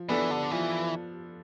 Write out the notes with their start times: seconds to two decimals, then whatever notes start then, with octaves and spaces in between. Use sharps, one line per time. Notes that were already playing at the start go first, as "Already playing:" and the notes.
Already playing: F3
0.09 E3 B3 D4 A4
0.31 D3
0.51 E3 F3